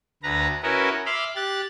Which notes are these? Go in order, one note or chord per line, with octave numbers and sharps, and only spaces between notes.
D2 B4 A#5
C#4 E4 F#4 A#4 B4 D#5
E5 B5 C6 D6 F6
G4 F#6 A6